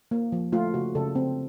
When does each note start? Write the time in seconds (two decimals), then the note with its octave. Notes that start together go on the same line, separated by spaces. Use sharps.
0.11 A#3
0.32 F3
0.52 A3 F4
0.74 C#3 F#4
0.95 C#3 A4
1.15 C4